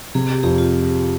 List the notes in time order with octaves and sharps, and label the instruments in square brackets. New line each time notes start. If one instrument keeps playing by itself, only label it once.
[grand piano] C3 [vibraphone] G#4
[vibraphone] G4
[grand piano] F2 [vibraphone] G4
[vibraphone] F4